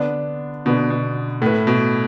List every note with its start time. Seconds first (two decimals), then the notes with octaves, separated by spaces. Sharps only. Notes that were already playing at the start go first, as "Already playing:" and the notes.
Already playing: D3 B3 D4
0.65 B2 D3 B3 D4
0.90 B2
1.41 A2 A3 E4 B4
1.67 B2